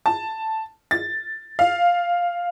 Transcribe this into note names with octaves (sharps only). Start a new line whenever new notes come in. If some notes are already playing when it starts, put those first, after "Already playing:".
A5
A6
F5